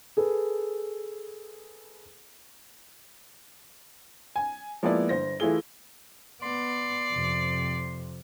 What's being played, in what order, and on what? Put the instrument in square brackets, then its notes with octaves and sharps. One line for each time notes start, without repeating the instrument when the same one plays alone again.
[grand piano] G#4 A4 B4
[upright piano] G#5
F3 G#3 A#3 B3 E4 D5
G1 C5 A#6
E3 A3 E4 F4 G#4 G7
[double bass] B3 [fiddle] D5 [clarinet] C6
[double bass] F2 C3